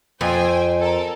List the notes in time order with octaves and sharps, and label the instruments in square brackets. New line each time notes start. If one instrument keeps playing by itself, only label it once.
[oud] F2 [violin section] C5 G5 G#5
[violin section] A4 A#4